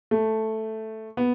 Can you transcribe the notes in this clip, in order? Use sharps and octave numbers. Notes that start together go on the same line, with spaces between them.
A3
B3